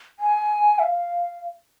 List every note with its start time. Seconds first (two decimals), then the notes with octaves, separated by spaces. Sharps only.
0.20 G#5
0.79 E5
0.84 F5